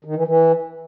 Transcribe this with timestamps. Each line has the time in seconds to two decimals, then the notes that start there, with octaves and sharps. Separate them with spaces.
0.04 D#3
0.16 E3
0.27 E3